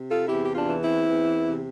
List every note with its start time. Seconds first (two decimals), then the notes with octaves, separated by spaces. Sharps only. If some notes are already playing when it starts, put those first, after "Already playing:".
Already playing: C3
0.09 F4 A4
0.28 E2 E4 G4
0.44 G4
0.54 D4 F4
0.68 E3
0.82 C4 E4
1.09 E2
1.48 C3